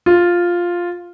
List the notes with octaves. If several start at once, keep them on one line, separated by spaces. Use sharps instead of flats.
F4